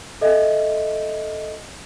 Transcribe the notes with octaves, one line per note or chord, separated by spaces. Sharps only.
A4 D#5 E5